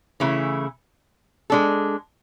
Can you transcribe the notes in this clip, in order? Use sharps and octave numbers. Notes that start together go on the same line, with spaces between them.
C#3 E3 A3 E4
G#3 D4 A4